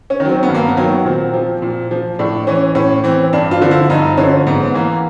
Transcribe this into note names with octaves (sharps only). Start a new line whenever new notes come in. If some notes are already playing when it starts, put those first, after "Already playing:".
C#4
D#3
F#3 C4
B3
G2
A#3
B3
D#3 F#3
A#2 C4
F3
A#2
F3
A2 D4
E3 C#4
A2 C#4
E3 C4
G2 D4
F4
D3 F3
E4
G2 D#4
D3 F3 C#4
G#2 B3
E3 A#3